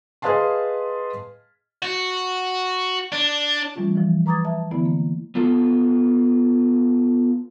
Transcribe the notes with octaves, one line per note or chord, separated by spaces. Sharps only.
G#4 B4 D#5 F5 A5 C6
F#4
D4
E3 G3 A3 C#4 F4
E3 F3
B4 A#5 D6 D#6 G#6 A6
E5 A5
D3 E3 A3 B3 E4
A#3
B3 F4 A4